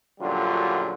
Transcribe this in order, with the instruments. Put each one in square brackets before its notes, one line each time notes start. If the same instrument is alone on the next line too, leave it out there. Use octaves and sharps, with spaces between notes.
[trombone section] A#1 F#2 D3 G3 F4 F#4